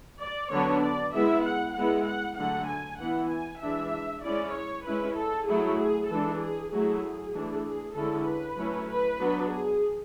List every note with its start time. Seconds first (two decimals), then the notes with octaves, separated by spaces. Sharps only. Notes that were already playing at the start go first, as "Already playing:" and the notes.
0.22 D5
0.52 D3 F#3 B3 D4 C#5
0.83 D5
1.14 G#3 B3 E4 E5
1.45 F#5
1.76 G#3 B3 E4 F#5
2.07 F#5
2.38 D3 F#3 A3 F#5
2.69 G#5
3.00 E3 B3 E4 F#5
3.31 G#5
3.62 E3 G#3 D4 E5
4.24 G#3 C#4 E4 D5
4.55 C#5
4.86 G#3 C#4 E4 B4
5.18 A4
5.48 F#3 A3 E4 G#4
5.80 G#4
6.10 E3 G#3 D4 A4
6.41 G#4
6.72 F#3 A3 E4 G#4
7.34 E3 A3 D4
7.65 G#4
7.96 D3 G#3 C#4 E4 A4
8.27 B4
8.58 F#3 A3 C#4 E4
8.89 B4
9.20 F#3 B3 D4
9.51 G#4